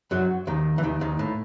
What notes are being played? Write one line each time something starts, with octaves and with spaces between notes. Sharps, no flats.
F#2 F#3
D#2 D#3
E3
D#2 D#3
D#2 D#3
A2